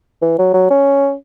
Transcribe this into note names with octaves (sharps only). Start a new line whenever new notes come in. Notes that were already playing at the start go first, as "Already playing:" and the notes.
E3
F#3
F#3
C#4